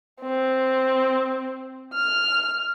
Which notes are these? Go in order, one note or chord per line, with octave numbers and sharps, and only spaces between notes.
C4
F6